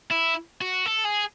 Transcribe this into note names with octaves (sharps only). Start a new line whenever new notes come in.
E4
F#4
A4
G#4